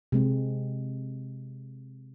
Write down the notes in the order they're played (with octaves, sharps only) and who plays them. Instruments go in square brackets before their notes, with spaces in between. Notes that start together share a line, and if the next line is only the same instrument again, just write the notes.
[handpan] C3 G#3 C4